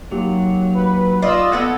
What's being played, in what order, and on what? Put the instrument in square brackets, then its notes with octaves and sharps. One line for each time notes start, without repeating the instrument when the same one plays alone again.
[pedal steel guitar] F#3 [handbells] A#3 D#4 G4
[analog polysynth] B4
[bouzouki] F4 D5 [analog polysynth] D#5 E6
[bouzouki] A3 B3 A4 [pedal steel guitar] F#5 [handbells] G#6